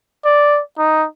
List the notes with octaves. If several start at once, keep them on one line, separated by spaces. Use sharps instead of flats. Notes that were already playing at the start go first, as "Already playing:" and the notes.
D5
D#4